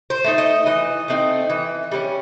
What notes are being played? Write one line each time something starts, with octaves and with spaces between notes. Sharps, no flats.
C5
A3 C4 D#4
D#5
E3 D#5
A3 C4 D#4
E3
G3 A#3 C#4